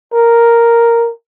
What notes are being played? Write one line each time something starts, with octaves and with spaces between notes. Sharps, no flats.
A#4